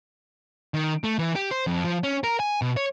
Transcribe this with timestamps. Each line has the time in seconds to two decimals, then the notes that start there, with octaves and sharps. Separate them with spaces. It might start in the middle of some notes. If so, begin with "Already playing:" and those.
0.74 D#3
1.04 A3
1.19 E3
1.35 G4
1.51 C5
1.67 F2
1.84 F3
2.03 C#4
2.24 A#4
2.40 G#5
2.62 B2
2.77 C#5